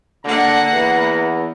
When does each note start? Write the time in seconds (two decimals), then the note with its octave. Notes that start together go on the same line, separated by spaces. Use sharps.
0.25 D3 A#3 F#5 A#5
0.71 E2 B4